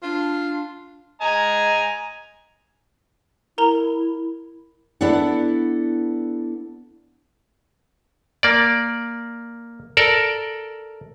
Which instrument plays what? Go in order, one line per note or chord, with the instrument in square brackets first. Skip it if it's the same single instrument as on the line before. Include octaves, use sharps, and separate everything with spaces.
[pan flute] D4 [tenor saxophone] F4
[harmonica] D#5 G#5 A#5
[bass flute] E4 [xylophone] A#4 A#5 G7
[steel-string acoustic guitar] B3 D4 E4 A4 F#5
[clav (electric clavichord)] A#3 D5
A4 A#4 D5